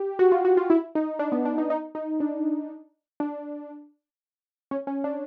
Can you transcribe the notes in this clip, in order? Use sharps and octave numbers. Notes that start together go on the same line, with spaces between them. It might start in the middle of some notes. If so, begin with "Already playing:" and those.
Already playing: G4
F#4
F4
F#4
F4
E4
D#4
D4
B3
D4
D#4
D#4
D#4
D4
D4
C#4
C#4
D4